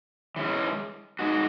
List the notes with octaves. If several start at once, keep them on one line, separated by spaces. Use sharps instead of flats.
E3 G#3 C#4
G#3 D#4 F#4